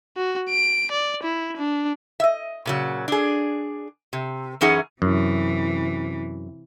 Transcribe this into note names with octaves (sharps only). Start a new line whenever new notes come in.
F#4
D7
D5
E4
D4
D#5 E5
A#2 C#3 F#3
D4 G#4
C3
F#2 E3 C#4 D#4 G#4 F#5
F#2 C3 E3